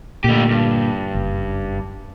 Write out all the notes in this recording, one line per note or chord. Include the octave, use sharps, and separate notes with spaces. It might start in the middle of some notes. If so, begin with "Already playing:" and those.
A#2 D3 A3 G4
G2
F#1